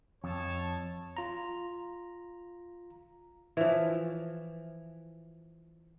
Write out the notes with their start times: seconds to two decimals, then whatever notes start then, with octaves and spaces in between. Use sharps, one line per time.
0.24 F2 C#5 A5
1.17 F4 A#5
3.57 E3 F3